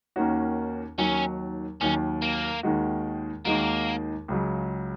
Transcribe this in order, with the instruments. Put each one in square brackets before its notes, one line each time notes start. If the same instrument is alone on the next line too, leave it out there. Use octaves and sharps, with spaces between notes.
[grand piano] D#2 D#3 A#3 C#4 F#4
[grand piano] D#2 D#3 F#3 [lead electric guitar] C#4
[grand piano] D#2 D#3 F#3 [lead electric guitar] C#4
[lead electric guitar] A#3
[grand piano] D#2 D#3 G#3 D#4 F#4
[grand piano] D#2 D#3 G#3 D#4 F#4 [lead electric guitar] A#3
[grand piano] C#2 C#3 F#3